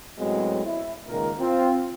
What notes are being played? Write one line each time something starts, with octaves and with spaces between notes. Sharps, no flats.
A2 F#3 G#3 B3 C4 F#4
E4
C#2 A#2 D#3 A#4
C4 F4